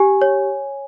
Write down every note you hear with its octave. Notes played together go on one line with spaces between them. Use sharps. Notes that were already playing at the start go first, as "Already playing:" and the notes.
Already playing: G4 G#5
C#5